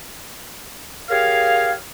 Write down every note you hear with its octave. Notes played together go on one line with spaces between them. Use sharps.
G4 G#4 A#4 C#5 F5